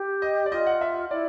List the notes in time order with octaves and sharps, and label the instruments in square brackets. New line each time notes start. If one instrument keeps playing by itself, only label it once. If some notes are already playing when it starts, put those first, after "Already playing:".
Already playing: [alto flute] G4
[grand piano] D#5
D5
[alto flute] F4 [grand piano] D#5
[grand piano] F#5
E5
[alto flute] E4 [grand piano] D5